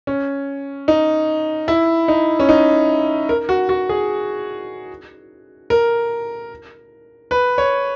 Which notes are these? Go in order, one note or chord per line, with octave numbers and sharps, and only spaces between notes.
C#4
D#4
E4
D#4
C#4
D#4
A#4
F#4
F#4
G#4
A#4
B4
C#5